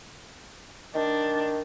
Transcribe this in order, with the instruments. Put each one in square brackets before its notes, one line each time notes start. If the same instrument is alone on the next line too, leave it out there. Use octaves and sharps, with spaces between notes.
[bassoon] D#3 [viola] D4